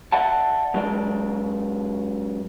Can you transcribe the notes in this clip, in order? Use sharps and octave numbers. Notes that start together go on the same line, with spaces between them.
D5 E5 F#5 A5
F#2 G#3 D5